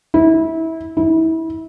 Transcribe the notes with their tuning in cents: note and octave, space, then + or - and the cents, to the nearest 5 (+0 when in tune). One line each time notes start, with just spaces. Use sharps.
E4 -25
E4 -30